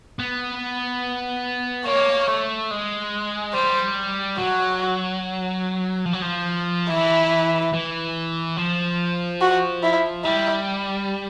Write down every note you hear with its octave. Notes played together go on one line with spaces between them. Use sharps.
B3
A#3 C#5
A3
G#3
G3 C5
F#3 F#4
F3
F#3
F3
E3 E4
E3
F3
F#4
E4
G3 E4